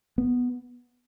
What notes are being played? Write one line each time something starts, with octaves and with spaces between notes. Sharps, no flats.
B3